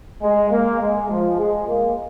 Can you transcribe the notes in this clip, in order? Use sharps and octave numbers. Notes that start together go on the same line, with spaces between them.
G#3
A#3
G#3
F3
G#3
A#3